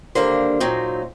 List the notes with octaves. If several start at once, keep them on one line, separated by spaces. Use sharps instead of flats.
D#2 D3 G3 A#3 D4 C5
A#2 F#3 C4 D#4